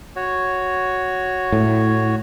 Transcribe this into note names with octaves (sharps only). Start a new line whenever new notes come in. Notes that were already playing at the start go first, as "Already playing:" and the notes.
F#4 C#5
A2